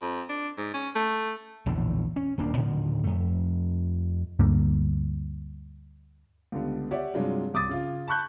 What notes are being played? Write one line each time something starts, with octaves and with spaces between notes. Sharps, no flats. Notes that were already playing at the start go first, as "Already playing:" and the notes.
F2
D4
G#2
C#4
A3
A#1 E2 A2 D3
C#4
D#1 D2 A#3 D4
A2 D3 D#3 F3
F2 A3
D2 G2 D3 A#3
C#2 D3 G3 B3
G4 C#5 D5 E5 F#5
G2 C3 F#3 G#3 D4 F4
C2 D6 D#6 A6
C#3 F4
A5 B5 C#6 F#6 G6